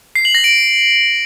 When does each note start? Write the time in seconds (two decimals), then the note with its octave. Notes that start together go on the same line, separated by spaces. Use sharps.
0.15 C7
0.25 F#7
0.35 A#6
0.44 D7